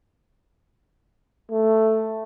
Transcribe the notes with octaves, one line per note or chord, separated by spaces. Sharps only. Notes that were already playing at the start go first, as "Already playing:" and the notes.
A3